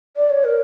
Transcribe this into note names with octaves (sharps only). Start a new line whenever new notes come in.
D5
C#5
A#4